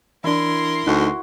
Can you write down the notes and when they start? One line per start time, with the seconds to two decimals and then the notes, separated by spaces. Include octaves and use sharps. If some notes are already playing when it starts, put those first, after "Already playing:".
0.24 E3 D4 E4 A#4 C6
0.87 D2 D#4 F#4